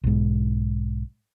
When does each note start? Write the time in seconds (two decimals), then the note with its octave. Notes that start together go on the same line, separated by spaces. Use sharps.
0.04 B1 G#2